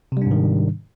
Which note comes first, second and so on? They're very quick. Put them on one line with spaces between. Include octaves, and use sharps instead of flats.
C3 G3 D4 G#2 D#3